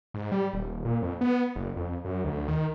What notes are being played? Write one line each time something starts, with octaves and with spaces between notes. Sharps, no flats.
G#2
G3
D#1
A#2
F2
B3
F#1
F2
F#2
D2
D#3